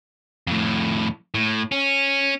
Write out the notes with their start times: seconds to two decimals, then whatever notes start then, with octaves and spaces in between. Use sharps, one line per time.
0.47 F2 A2
1.34 A2
1.72 C#4